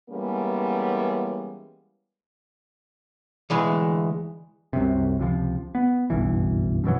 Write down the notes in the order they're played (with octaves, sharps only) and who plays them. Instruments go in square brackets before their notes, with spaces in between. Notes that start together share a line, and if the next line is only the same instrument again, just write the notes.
[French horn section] E3 G3 G#3 A#3 B3 C#4
[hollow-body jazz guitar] D2 E3 G#3
[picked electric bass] C2 F#2 C3
C#2 C3 F3
B3
F#1 B1 G2 E3
F#2 B2 E3 F#3